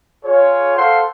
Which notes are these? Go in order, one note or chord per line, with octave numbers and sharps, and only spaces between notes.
F4 G#4 C#5
A4 C5 F5 F#5 C6